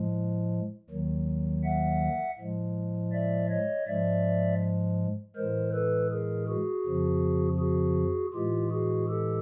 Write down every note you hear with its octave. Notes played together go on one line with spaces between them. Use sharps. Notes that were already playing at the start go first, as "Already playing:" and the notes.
Already playing: A2 F3 G#3
D#2 D#3 F#3
E5 F#5
A2 F3 G#3
D5 E5
C#5 D#5
G#2 F3 G#3 D5 E5
A2 E3 G#3 A#4 C5
A4 B4
G#4 A#4
F#4 G#4
F2 C#3 F3
F#4 G#4
A2 E3 G#3 F4 G4
F#4 G#4
G4 A4